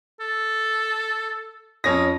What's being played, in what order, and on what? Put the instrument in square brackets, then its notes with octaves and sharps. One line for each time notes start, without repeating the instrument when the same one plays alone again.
[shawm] A4
[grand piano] F2 C#4 A#6 [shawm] D#6